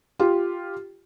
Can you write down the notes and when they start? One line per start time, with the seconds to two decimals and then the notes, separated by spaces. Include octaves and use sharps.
0.19 F4 G4